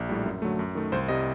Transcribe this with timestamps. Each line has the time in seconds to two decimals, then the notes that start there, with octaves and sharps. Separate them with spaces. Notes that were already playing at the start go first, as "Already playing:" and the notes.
Already playing: A#1
0.09 A2 G3
0.26 F#2
0.42 D3 F#3 A3
0.59 F#2
0.75 D#3 A3
0.92 C2 C5
1.08 C3 G3 D#5